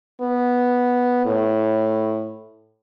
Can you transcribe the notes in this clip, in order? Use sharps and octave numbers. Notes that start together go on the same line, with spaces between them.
B3
A2